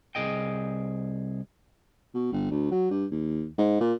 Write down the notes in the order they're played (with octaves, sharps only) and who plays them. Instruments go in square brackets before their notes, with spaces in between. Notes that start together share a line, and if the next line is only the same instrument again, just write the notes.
[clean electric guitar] C2 C3 G#4 D#5 G5
[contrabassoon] B2
G1
D2
F#3
G2
D#2
G#2
A#2